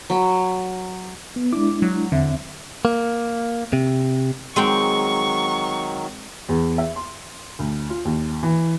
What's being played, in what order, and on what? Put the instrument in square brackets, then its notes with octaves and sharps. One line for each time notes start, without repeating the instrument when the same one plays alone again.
[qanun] F#3 B5
[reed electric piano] B3
[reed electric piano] G#3 D4 E4 [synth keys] D6
[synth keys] F#3
[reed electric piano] E2 C4 E5 [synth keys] D3
[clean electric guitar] A#3
C3
[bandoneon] D#3 F#3 [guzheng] G#3 C4 G5 [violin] C#6
[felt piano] E2
E5
C6
D2
F4
D#2
E3